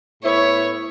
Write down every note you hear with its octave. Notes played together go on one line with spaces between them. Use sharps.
A2 B3 E4 C#5